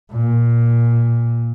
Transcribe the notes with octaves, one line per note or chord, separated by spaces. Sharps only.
A#2